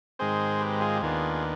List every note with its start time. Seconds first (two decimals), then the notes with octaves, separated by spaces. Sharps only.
0.19 G#2 D#3 G#3 C4 G#4 C5
0.60 G4 B4
0.81 F4 G#4
0.95 G4
1.02 D#2 D#3 B3 D4 F4 G#4
1.34 G#4